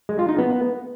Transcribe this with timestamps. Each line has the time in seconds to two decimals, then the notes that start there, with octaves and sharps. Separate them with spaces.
0.09 G#3
0.19 F4
0.29 D#4
0.38 B3